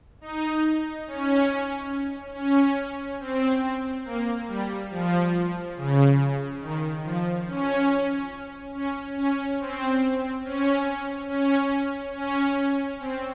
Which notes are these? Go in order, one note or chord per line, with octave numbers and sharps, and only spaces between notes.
D#4
C#4
C#4
C4
A#3
G3
F3
C#3
D#3
F3
C#4
C#4
C#4
C4
C#4
C#4
C#4
C4